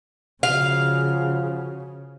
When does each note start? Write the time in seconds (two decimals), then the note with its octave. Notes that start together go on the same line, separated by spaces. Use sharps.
0.43 C#3 F3 F#4 F5